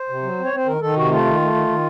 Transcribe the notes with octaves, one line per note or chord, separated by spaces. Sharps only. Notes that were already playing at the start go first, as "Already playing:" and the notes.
Already playing: C5
C3
F#3
C4
C#5
C4 C5
D#3 A#4
D#3 A4
C3 F#4
A3 F4
D#3
A3
D#3
D#3